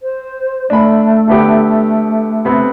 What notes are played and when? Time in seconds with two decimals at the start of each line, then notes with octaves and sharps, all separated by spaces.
0.01 C5
0.70 A3 D4 B5
1.28 D3 B3 G4
2.45 C3 B3 C4